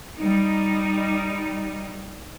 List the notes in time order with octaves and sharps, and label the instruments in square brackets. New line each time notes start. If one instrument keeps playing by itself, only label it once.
[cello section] G3 D#4